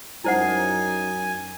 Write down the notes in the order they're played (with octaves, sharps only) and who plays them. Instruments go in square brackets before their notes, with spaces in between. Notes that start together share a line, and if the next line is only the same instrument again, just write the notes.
[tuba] F#2 [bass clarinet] D#4 [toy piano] E4 C5 F#5 [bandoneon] G#5